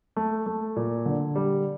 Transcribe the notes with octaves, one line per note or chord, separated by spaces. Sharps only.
A3
A3
A#2
D3
G3